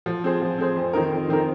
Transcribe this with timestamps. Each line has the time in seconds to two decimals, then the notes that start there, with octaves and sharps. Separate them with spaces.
0.06 F3
0.24 C4 G#4 C5
0.41 F3
0.58 C4 G#4 C5
0.76 F2
0.93 D#3 C4 D#4 A#4
1.11 F2
1.29 D#3 C4 D#4 A#4